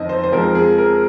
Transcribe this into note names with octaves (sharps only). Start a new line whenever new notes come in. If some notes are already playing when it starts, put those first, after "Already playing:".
Already playing: F2 D#3 C4 D#5
C5
C5
F2 F3 G#3 C4 A#4
G#4
A#4